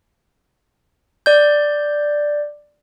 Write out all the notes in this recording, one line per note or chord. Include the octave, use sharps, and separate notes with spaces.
D5 G6